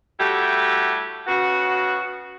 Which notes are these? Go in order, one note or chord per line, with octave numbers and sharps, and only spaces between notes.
G3 A3 E4 F#4 G4
C#3 B3 F#4